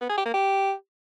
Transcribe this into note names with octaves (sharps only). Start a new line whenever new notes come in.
B3
G#4
G4
A#3
G4